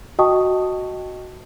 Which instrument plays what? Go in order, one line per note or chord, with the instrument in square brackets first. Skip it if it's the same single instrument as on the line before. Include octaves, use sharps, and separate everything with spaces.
[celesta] F#4 D#5 G5 A5 C#6 D#6